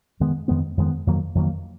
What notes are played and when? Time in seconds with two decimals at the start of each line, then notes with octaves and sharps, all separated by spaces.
0.20 F2 D#3 G#3 B3
0.48 F2 D#3 G#3 B3
0.77 F2 D#3 G#3 B3
1.07 F2 D#3 F#3 A#3
1.35 F2 D#3 F#3 A#3